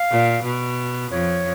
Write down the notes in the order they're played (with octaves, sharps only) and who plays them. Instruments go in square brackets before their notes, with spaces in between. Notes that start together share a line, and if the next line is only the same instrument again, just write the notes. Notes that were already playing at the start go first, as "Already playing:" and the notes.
Already playing: [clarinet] F5
[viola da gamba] A#2
B2
[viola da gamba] F2 [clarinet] C#5